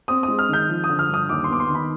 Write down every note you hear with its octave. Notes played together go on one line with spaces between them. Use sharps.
C4 D#6
D#6
G#3
F6
D#3 G6
F3
D#6
D3
F6
G2 D#6
D#2 D6
C6
B3 D6
C6
D#3
B5